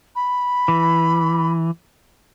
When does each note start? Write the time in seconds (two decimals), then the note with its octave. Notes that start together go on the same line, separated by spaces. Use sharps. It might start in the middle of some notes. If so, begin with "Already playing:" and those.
0.16 B5
0.68 E3